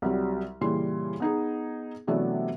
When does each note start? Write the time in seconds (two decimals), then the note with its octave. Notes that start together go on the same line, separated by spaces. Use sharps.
0.02 C2 F#3 G3
0.61 A#2 C#3 E3 G3 C6
1.20 B3 D#4 G#4
2.07 C3 E3 F#3 A3 B3 D4